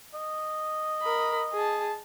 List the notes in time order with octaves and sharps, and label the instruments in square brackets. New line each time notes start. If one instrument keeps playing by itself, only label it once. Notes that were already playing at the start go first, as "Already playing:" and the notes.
[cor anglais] D#5
[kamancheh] A#4 B5
G#4 A5